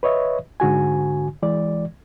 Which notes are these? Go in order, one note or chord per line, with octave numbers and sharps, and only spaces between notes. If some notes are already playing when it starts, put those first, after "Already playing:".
B4 C#5 D#5 E5
G#2 D3 F#4 G#5
E3 G#3 D5